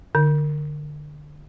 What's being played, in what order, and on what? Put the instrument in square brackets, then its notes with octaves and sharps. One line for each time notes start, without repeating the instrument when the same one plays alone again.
[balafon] D3